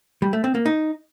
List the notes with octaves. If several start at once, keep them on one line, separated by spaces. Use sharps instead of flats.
G3
A3
C4
A#3
D#4